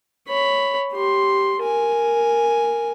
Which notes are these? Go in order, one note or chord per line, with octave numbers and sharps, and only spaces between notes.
C#5 B5
G4 C6
A#4 G#5